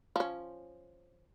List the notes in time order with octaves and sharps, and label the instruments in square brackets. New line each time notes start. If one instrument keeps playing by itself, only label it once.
[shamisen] F3 C#4